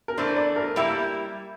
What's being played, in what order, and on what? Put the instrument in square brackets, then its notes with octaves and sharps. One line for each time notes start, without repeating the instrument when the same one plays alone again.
[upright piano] A#4
[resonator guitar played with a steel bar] E3 A3 D4 [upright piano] C5
[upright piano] D5
A#4
[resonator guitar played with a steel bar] G3 A#3 E4 [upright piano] E5
[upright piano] E5